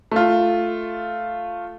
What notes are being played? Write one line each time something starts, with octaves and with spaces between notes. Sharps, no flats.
A3 F4